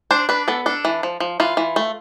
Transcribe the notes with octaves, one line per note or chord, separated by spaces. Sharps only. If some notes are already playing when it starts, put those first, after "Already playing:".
D4 C5
D4 B4
B3 A4
D4 A4
E3
F3
F3
E3 F4
E3
A3